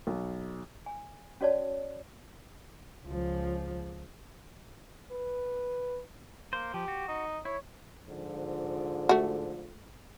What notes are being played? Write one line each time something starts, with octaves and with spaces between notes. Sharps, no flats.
B1
G#5
C#4 F#4 C#5 D5 A5
C#2 F3
B4
A#3 C5
F3 G4
F#4
D#4
E4 C#5
G#2 D3 F3
A3 F#4